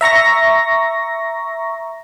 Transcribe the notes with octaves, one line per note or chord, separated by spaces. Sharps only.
E5 A#5 C#6 A#6